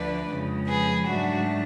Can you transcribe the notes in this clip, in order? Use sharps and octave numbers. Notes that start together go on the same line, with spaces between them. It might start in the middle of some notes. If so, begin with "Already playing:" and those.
Already playing: D2 D3 F3 A3 D4 B4 D5
F2 C#3 F3 G#3
G#4 B4
G#2 F#3 A3 D4 F#4